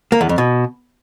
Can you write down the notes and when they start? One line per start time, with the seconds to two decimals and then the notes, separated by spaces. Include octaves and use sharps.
0.12 A#3
0.21 E2
0.29 F2
0.38 B2